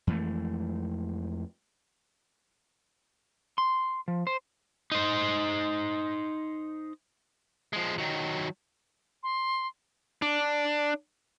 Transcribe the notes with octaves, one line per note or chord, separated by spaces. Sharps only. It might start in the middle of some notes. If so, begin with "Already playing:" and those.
F2 E3 G#3 A3
C6
F3
C5
D#4 C5
F3 G#3
D#3 F#3
C6
D4